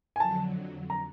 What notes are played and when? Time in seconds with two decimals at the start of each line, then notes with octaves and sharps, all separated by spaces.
0.16 G#5
0.20 F2 D3 F#3 A5
0.90 A#5